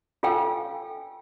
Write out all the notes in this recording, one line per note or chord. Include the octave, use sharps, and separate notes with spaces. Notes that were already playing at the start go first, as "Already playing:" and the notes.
F4 A4 F5 G5 G#5 E6